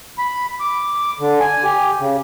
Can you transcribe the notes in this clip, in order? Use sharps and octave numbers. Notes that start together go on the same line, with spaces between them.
B5
D6
D3
G#5
G4
C#3